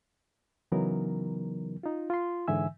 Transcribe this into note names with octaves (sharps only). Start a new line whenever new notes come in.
C#3 E3 F#3 B3 D#4 A#4
D#4 F4
F4 C6
G#2 D3 E3 E5 G#5 E6